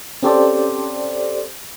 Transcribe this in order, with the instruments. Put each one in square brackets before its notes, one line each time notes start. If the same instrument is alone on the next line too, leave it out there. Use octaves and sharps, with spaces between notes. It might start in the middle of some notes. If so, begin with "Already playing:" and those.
[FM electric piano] C4 C#4 G4 A4 C5 D5